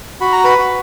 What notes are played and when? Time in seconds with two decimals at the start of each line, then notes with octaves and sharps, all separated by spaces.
0.21 F#4 B5
0.33 A#5
0.44 B4 B5
0.58 F#4